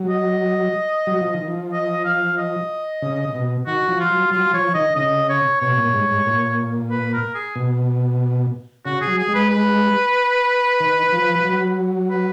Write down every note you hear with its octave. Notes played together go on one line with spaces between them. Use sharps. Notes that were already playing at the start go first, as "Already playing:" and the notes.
Already playing: F#3
D#5
F#3
F3
D#3
F3
D#5
F5
D#5
C#3
B2
D#3 F#4
F3
F4
F#3
F#3 F4
F3 C#5
D#3 D#5
C#3 D#5
C#5
B2 C#5
A#2
G#2
G#2
A#2
B4
A#4
G#4
B2
C#3 F#4
G#4
F#3
G#4
G#3
B4
B4
D#3
F3
F#3
B4